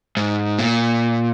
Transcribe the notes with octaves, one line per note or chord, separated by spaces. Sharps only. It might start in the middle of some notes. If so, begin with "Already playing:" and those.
G#2
A#2